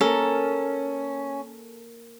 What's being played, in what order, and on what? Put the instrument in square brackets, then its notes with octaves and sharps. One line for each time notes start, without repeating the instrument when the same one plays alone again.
[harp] A#3 A#4 [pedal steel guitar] C#4 [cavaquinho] A4